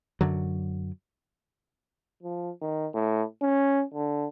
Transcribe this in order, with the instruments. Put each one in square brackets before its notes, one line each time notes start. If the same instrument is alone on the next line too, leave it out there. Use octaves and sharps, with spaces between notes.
[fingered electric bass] F#2 D3 F#3
[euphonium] F3
D#3
A2
C#4
D3